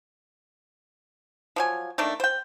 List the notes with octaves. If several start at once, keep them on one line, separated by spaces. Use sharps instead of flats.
F3 F#3 G#5
D#3 A3 A#3 D4
C5 G5